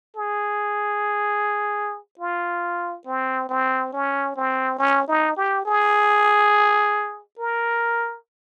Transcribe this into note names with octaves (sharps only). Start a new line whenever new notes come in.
G#4
F4
C4
C4
C#4
C4
C#4
D#4
G4
G#4
A#4